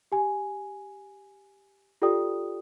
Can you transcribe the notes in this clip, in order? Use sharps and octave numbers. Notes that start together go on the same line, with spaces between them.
G4 G#5
F4 G4 A4 D5 G5 D#6